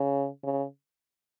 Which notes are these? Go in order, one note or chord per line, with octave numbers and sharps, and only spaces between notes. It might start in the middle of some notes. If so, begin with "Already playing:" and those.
Already playing: C#3
C#3